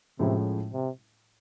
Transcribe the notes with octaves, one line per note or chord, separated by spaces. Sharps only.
A2 C3 F3 G#3 C#4 E4
C3